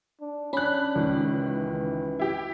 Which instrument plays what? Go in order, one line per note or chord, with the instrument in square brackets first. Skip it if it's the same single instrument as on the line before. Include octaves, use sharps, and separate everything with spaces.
[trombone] D4
[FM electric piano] C#4 [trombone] D4 [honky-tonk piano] B5 F#6
[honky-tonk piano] C#2 D#3
[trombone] E3
[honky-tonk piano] E4 G4